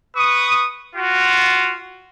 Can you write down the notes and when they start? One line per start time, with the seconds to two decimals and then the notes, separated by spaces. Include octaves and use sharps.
0.17 B4 C#6 D#6
0.95 F4 F#4